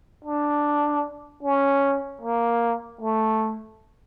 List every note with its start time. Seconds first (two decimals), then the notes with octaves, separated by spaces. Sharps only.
0.24 D4
1.43 C#4
2.21 A#3
3.01 A3